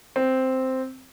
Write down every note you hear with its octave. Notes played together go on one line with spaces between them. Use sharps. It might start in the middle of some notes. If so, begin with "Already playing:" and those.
C4